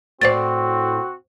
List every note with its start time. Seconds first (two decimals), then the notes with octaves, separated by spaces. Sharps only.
0.21 A2 C4 F#4 C5 D5 A6